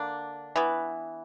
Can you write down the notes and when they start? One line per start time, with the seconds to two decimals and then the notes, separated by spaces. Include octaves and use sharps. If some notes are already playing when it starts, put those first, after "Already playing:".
Already playing: D3 A#3 D4
0.56 E3 B3